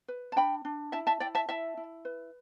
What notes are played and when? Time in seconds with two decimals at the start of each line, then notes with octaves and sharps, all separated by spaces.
0.08 B4
0.32 A5
0.36 D4 G5 B5
0.65 D4
0.92 E4 E5 A5
1.07 E5 A5
1.20 E4 D5 G5
1.35 E5 A5
1.49 E4 E5 A5
1.77 E4
2.05 B4